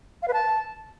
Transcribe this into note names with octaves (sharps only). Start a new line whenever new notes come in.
F5
B4
A5